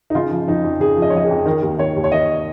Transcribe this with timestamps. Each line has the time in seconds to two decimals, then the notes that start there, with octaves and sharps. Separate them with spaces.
0.10 D#4
0.15 C#3 F4
0.31 F3
0.48 F2 D#4
0.65 F2
0.80 C#3 G#4
0.96 F3
1.02 D#5
1.10 C#5
1.13 F2 D#5
1.24 G#4
1.30 F2
1.46 D#3 A#4
1.62 D#2
1.78 D#3 C#5
1.96 D#2
2.04 C#5
2.11 D#3 D#5